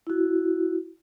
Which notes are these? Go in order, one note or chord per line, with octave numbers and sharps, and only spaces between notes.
E4 F#4